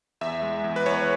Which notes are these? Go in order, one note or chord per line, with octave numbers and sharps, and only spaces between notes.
E2 E5
G#3
E2
B4
E2 C#5